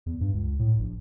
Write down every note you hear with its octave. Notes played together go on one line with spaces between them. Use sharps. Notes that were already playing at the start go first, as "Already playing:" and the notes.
E2
G2
C#2
A2
A#1